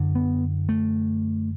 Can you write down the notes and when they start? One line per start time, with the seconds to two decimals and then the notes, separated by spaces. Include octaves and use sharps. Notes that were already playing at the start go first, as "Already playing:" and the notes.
Already playing: F#2 D3
0.15 B3
0.69 A3